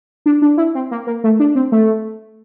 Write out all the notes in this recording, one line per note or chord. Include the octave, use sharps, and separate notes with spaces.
D4
D4
E4
C4
A#3
A#3
A3
D4
C4
A3